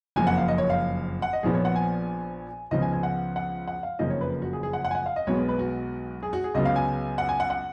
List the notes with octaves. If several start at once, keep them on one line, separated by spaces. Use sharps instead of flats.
F#1 F2 F3 A#3 G#5
F#5
F5
D#5
C#5
F5
F#5
D#5
A#1 A#2 F3 B3 G#4
C#5
F#5
G#5
C#2 C#3 F3 B3 D#5
G#5
G#5
F#5
F#5
F#5
F5
F#1 F2 C#3 F3 A#3 D#5
C#5
B4
F#4
G#4
G#4
F#5
F#5
G#5
F#5
F5
D#5
B1 B2 G#3 B3 C#5
B4
B4
F#4
G#4
F#4
G#4
C#2 C#3 F#3 B3 D#5
F5
G#5
F#5
G#5
F#5
F#5